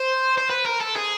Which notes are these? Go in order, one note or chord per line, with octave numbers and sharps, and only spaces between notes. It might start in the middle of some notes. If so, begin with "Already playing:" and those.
Already playing: C5
C5
B4
A#4
A4
G#4